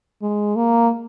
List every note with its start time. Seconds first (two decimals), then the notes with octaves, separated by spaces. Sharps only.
0.22 G#3
0.56 A#3